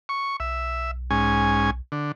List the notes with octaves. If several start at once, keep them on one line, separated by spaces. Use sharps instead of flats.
C#6
B1 E5
G#2 C#4 G#5
D3